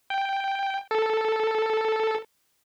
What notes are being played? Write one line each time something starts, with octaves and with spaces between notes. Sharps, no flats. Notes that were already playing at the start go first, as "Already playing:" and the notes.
G5
A4